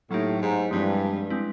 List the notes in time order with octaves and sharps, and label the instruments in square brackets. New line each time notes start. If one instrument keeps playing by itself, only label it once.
[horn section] A2 [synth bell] F#3 A#3 D#4 G4
[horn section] G#2
[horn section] G2 [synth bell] F3 G#3 C4 E4
[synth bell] G#3 C4 E4